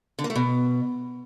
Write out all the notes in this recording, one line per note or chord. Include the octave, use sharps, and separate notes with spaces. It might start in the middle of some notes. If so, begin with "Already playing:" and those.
D3
A#3
A3
B2